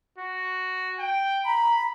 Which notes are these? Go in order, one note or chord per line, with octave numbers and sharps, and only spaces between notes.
F#4
G5
A#5 B5